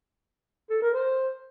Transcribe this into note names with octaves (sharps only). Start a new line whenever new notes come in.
A4
A#4
C5